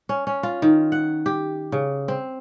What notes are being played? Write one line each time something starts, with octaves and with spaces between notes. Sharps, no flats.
C#4
C#4
F4
D#3
F#5
G4
C#3
C4